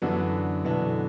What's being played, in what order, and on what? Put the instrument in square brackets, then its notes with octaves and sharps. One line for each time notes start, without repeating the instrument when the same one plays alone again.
[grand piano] F#2 E3 B3 D4 F#4 [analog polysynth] D3
[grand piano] F#2 E3 B3 D4 F#4 [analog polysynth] B2